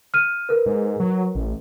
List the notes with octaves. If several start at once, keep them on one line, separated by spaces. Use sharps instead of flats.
F6 D#7
A#4 B4
G#2
F#3
A1